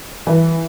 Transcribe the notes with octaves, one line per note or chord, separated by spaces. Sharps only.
E3